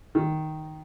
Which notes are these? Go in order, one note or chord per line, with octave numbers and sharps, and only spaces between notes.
D#3